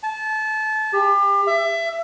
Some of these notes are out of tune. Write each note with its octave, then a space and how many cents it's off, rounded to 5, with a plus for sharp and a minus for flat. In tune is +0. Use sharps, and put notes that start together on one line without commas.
A5 -25
G4 +30
E5 +25